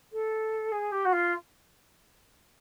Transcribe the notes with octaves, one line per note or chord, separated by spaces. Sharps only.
A4
G#4
G4
F#4
F4